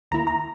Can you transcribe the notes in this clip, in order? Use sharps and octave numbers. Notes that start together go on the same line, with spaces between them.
D#2 D#3 A#3 E4 A#5
A#5